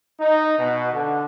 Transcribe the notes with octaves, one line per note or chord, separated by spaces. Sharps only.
D#4
B2
D3